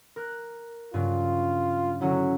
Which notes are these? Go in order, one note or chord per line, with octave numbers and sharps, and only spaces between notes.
A#4 F#6
G2 C#3 F#3 F4
D3 F#3 C#4 E4